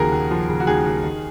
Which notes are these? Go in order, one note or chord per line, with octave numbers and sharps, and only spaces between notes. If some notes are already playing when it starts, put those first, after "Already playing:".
Already playing: D#2 C#3 F3 F#4 G#4 A#4
D#2
F3
C#3
F#4
D#2 G#4
D#2
D#3